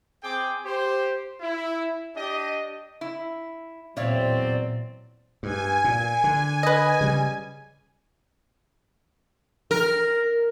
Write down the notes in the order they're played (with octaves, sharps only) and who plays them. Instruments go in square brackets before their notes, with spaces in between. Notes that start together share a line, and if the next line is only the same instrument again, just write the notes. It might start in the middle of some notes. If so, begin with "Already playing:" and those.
[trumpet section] C4 G#4 G5 D6
G4 C5
E4
D4 G4 D#5
[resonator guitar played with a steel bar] E4
[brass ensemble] E2 F#3 C4 [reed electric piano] A#2 [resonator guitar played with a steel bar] C#5 E5 F5 [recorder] D5
[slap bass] G2 [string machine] G#5
[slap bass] A#2
D3
[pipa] B4 D#5
[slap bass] C#3 G3
[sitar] A#4